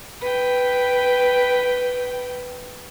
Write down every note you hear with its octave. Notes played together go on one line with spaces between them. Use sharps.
B4 G5